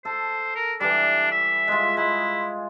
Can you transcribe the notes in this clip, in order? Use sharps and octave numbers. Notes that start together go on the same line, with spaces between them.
A4 C5
A#4
E3 G3 D4
E5
G#3 F4
G#3 E4